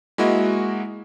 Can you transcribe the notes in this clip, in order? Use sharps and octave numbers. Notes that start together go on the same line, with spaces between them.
G#3 A#3 E4 F#4 D#5